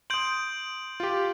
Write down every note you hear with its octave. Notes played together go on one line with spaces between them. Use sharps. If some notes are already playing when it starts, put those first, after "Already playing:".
C6 D#6 G6 D7 F#7
F4 G4